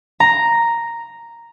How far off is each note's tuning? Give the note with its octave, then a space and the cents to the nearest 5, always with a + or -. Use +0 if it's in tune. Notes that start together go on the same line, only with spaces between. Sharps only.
A#5 +0